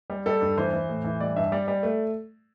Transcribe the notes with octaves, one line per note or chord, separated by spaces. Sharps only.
G3
G3 A4
G2
E3 C5
E3
A2
E3
G3 D5
G2 E5
G3 D5
G3
A3